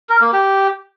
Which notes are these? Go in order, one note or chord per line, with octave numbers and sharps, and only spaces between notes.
A#4
A#3
G4